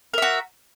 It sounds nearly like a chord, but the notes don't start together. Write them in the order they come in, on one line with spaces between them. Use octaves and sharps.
A#4 E5 F#4